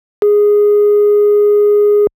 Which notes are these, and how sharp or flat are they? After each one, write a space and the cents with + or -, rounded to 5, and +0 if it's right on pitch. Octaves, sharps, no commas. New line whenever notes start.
G#4 -5